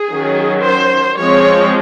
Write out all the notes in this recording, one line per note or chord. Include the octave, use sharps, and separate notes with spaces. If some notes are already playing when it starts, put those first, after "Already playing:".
Already playing: G#4
D#3 F#3 C#4
C5
F3 G#3 C4 C#5